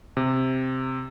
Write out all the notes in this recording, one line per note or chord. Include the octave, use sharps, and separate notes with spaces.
C3